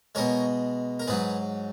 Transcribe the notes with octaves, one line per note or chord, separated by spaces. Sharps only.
B2 G#3 A#4 C#5
A#4
G#2 F#3 G#4 B4